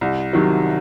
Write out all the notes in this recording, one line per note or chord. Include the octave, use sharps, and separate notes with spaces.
C2
C3 D#3 F#3